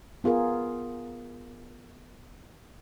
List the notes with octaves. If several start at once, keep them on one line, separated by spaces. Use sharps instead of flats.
B3 F4 G#4 A#4